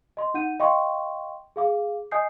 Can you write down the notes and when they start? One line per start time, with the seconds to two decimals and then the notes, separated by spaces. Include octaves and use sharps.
0.17 D#5 C6
0.34 D#4 F#5 G6 D#7
0.60 D#5 F5 G5 C6 C#6
1.56 G#4 F5 D6
2.11 D#5 G#5 D#6 G6 C7